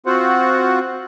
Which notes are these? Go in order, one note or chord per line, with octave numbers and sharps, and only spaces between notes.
C4 F4 F#4 C5 F#5